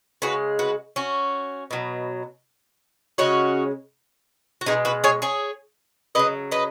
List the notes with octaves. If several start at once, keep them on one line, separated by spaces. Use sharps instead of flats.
C#3 G#3 F#4 B4
F#4 B4
C#4 F#4
B2 F#3
C#3 G#3 C#4 F#4
F#4
B2 G#3 D#4 G#4
F#4 B4
G#4 C#5
G#4 C#5
C#3 F#3 B4 D#5
B4 D#5